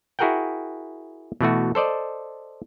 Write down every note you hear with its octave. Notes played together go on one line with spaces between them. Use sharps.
E4 F#4 G#4 A#4 F#5 G5
B2 E3 A3 F#4
A4 C5 D5 D#5